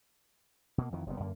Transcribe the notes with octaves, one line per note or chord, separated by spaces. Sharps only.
B2 A#3
F2 D#3 E3
F#1 C3 G3 B3
F#2 D3 A#3